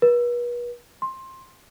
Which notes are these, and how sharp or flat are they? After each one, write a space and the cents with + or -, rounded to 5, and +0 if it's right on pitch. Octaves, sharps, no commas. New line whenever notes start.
B4 -40
C6 +15